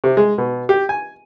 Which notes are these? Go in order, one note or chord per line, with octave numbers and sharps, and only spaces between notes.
C3
G#3
B2
G4
G#5